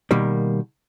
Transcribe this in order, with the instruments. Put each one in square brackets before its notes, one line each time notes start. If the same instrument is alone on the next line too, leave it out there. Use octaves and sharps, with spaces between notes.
[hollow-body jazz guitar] B2 D#3 G3 A#3